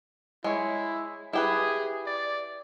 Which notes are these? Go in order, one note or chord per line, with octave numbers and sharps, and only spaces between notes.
G#3 E4 C#5
E4 G4 G#4 B4
D5